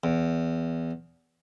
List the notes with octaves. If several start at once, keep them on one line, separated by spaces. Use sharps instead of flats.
E2